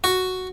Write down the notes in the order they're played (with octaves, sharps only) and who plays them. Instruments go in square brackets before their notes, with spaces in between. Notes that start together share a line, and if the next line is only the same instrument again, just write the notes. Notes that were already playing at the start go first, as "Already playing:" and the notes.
[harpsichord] F#4